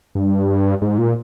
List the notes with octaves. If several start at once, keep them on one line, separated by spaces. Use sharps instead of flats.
G2
G#2
A#2